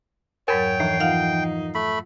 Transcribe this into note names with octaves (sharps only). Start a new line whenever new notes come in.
F2 G#2 F#3 A#4 C#5 G5
E3 F3 C7
D#4 F4 F5 F#5
A3 B5